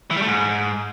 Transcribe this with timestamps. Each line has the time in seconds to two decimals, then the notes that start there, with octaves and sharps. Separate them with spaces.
0.11 E3
0.16 G3
0.22 A3
0.27 G#2